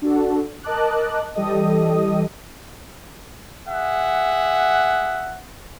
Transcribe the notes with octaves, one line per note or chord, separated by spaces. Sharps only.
D4 F#4 A4
A#4 D#5 A5 D6 F#6
E3 G3 G4 A4 D#5 D#6
G#4 E5 F#5